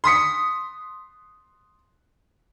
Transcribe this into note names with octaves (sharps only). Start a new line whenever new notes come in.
C6 D#6 B6 C#7